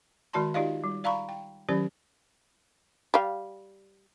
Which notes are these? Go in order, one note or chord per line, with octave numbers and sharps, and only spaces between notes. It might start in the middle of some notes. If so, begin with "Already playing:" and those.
D#3 G#3 F#4 D5 A5 C6
D#4 F4 G4 D5 D#5 F5
G3
D5 F5 A#5 B5 C#6
G5
D#3 F#3 C#4 G4 D5
G3 F5